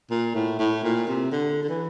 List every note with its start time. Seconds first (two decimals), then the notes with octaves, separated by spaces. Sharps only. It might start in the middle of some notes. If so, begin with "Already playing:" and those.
0.10 A#2
0.35 A2
0.59 A2
0.83 A#2
1.08 C3
1.32 D3
1.63 D3
1.69 E3